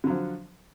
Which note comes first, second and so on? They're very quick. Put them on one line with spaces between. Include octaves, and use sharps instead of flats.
D3 F#3 F3